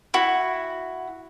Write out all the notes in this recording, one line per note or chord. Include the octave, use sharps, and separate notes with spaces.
E4 F#4